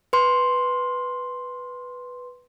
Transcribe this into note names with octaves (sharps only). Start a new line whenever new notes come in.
B4 C6